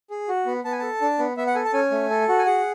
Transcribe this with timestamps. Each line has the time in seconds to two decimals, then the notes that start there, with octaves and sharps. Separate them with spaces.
0.10 G#4
0.28 F#4
0.46 B3
0.64 B3 A5
0.72 G#5
0.79 A4 A5
1.01 D4
1.19 B3
1.37 B3 E5
1.47 F#5
1.55 A4 G#5
1.65 A5
1.73 C#4 G#5
1.91 A3
2.10 A4
2.29 F#4
2.39 G#5
2.46 G#4 F#5